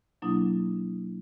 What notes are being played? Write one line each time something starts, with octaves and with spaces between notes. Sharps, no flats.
B2 F#3 A#3 D4 E4 D#6